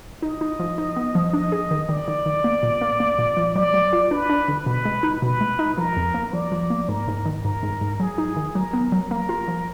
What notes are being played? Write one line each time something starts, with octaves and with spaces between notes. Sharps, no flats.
D#4 D#5
D#4
F3
D#4
B3
F3
D4 D#5
G#4
D#3
D#3 D5
D#3
D#3
A#3
A#2
A#3
A#3
A#2
F3
F#3 D5
F#3
F4
D4 B4
D4
D3
B2 B4
G#3
D#4
B2 B4
G#3
D#4
F3 A#4
F2
A#3
F3 D5
F3
A#3
G#2 A#4
G#2
D#3
G#2 A#4
G#2
G#2
F#3 G#4
D#4
D#3
F#3 A#4
B3
F#3
A#3 A#4
F4
F3